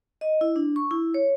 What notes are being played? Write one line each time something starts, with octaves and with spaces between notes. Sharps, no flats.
D#5
E4
D4
C#6
E4
C#5